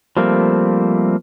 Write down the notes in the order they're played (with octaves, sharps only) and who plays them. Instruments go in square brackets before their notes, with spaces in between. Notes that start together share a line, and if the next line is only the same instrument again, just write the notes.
[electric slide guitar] F3 G3 A3 A#3 C4